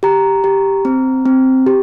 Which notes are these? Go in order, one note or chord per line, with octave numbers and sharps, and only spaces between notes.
G4 A#5
G4
C4
C4
G4